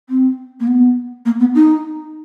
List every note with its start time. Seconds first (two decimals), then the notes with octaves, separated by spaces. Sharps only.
0.09 C4
0.60 A#3
0.67 B3
1.25 A#3
1.40 B3
1.55 D#4